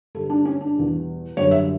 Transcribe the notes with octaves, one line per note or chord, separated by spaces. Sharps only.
G2 D3 G3 A4
D4
C#4
D4
E2 B2 G3
F#2 D3 G3 C#5
E5